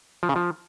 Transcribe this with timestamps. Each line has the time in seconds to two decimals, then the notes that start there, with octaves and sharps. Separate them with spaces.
0.23 F3
0.29 C#3
0.36 F3